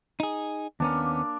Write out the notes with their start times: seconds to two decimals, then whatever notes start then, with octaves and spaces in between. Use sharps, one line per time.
0.20 D#4 G#4
0.80 D#2 A#3 B3 C#4 D4